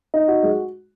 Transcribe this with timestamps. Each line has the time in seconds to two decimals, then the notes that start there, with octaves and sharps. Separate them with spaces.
0.14 D#4
0.28 F#4
0.43 G#3